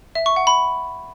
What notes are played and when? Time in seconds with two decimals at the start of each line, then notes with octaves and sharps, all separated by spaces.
0.15 E5
0.26 C#6
0.36 F#5
0.47 B5